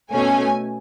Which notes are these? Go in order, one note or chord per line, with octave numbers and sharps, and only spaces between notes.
B2 A3 C#4 G#5